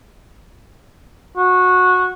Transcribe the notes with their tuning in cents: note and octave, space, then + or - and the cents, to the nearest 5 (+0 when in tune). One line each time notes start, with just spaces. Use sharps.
F#4 -20